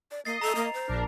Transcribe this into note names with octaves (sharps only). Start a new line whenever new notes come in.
D5
A#3 D#5 A6 C7
A4 A#5 F7
A#3
C5
A#1 D4 A#4